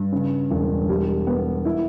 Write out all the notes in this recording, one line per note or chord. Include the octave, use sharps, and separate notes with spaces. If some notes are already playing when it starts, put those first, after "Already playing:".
Already playing: G2
C#3
E1
G3
B3
E4